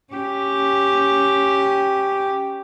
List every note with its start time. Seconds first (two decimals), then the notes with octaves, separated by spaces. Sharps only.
0.13 C#4 G4